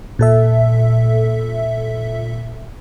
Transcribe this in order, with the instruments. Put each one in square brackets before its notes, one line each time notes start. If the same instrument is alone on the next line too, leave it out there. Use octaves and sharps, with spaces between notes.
[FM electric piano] A#2 A4 E5